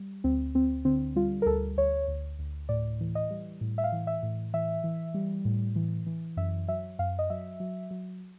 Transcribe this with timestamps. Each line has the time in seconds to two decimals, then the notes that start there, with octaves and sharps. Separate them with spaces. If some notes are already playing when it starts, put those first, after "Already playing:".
Already playing: G3
0.24 D2 C4
0.54 D2 C4
0.85 D3 C4
1.16 G3 F4
1.42 A#4
1.46 D2 A4
1.77 D2 C#5
2.08 D2
2.39 D2
2.69 A2 D5
3.01 E3
3.15 D#5
3.30 G3
3.61 A2
3.78 E5
3.84 F5
3.92 E3
4.07 E5
4.23 A2
4.54 E3 E5
4.84 E3
5.14 G3
5.45 A2
5.76 E3
6.07 E3
6.37 F#2 E5
6.68 F#3 E5
6.99 F#2 F5
7.19 D#5
7.30 F#3 E5
7.60 F#3
7.91 F#3